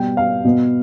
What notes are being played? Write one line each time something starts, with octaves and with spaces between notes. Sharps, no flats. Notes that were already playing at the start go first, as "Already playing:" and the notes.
Already playing: B2 G3 B3 G5
F5
B2 B3